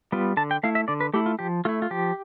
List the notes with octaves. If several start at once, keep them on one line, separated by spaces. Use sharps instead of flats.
G3 B3 F4
D3 A5
G5
A3 E4 F5
E5
D3 D5
B4
A3 E4 G4
F4
F3 G4
A3 E4 F4
F4
F3 G4